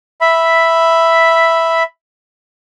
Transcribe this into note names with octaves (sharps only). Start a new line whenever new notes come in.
E5 B5